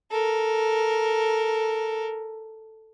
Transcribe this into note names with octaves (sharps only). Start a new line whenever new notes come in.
A4 A#4